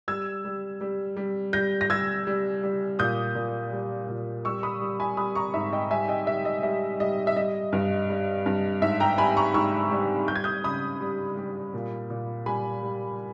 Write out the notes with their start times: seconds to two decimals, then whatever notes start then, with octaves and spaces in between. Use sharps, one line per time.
0.08 G3 E6 G#6
0.45 G3
0.81 G3
1.16 G3
1.53 G3 G6 A#6
1.81 A#6
1.89 G3 E6 G#6
2.27 G3
2.63 G3
2.99 A#2 D#6 G6
3.35 A#2
3.72 G3
4.08 A#2
4.45 G3 C#6 E6
4.63 B5 D#6
4.81 G3
5.00 G#5 B5
5.17 G3 B5 D#6
5.35 A#5 C#6
5.54 G#2 E5
5.73 D#5 G5
5.91 G3 E5 G#5
6.08 D#5 G5
6.27 G3 E5
6.45 D#5
6.63 G3 E5
7.00 G3 D#5
7.27 E5
7.36 G3 D#5
7.73 G2
8.10 G3
8.46 G2
8.82 G#2 E5
9.00 G5 A#5
9.18 G3 G#5 B5
9.37 A#5 C#6
9.54 G#2 C#6 E6
9.91 G3
10.28 G3 G6
10.36 G#6
10.44 D#6 G6
10.64 C#3 B5 D#6
11.01 G3
11.37 G3
11.74 A#2
12.10 A#2
12.46 G3 G#5 B5
12.83 G3